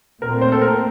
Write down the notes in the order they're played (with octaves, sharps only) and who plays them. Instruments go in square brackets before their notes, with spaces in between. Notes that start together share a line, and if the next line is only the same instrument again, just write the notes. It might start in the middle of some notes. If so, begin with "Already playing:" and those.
[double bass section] A#2 A3 C4 [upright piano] A#4
[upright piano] C5
A4
A#4